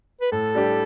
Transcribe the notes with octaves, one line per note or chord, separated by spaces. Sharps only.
B4
A2 A4
G3 D4 G4